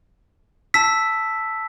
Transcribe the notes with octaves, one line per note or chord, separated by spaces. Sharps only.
A5 E6 B6